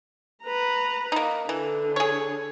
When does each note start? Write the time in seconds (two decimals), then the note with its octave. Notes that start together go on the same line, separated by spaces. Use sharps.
0.44 B4 A#5
1.12 A#3 D#4
1.49 D3 E3
1.96 G#4 C#5